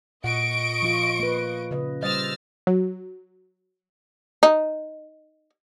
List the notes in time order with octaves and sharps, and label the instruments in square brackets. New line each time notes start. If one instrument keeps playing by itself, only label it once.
[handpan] A#2 F#5 [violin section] D#5 C#6 D7
[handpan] F3 F4
A#3 B4
C#3 B4 D#5
[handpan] G3 C5 D#5 [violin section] E6 F6 A6
[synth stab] F#3
[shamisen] D#4